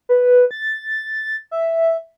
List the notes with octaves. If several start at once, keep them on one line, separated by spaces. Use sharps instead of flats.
B4
A6
E5